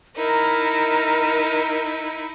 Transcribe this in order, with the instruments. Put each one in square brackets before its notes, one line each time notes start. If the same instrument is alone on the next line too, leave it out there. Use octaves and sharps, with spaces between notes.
[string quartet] D#4 E4 [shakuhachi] A#4